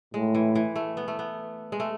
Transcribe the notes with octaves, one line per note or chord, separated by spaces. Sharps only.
A2 G#3
E3
E3
A3
B3
A3
B3
G#3
A3